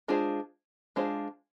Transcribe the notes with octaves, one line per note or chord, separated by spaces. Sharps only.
G#3 D4 F4 G#4 C5
G#3 D4 F4 G#4 C5